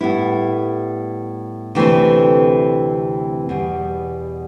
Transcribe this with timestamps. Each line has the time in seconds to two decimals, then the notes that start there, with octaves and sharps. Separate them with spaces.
0.01 A2 G3 B3 E4
1.75 D2 C3 E3 A3 C4
3.49 E2 B2 G3